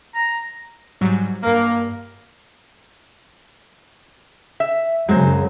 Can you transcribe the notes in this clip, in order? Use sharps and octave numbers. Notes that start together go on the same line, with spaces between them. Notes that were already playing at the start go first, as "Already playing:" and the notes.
A#5
G#2 F#3 G3
G2 A#3 A#5
E5
F#2 C#3 F#3 G#3 C5